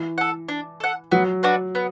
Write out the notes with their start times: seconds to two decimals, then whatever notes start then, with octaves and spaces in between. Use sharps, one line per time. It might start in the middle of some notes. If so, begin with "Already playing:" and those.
Already playing: E3
0.18 A4 F#5
0.49 D4
0.80 A4 F#5
1.11 F#3 B3
1.43 D4 F#4 B4
1.75 B3